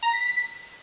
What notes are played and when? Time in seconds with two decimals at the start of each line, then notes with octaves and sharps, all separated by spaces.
0.03 A#5
0.08 A#6
0.13 B6